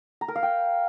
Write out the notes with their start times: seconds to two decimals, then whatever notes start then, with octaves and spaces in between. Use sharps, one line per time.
0.21 A#5
0.28 A#4
0.36 F5
0.43 G5